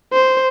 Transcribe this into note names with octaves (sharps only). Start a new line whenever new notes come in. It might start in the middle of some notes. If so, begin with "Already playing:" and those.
C5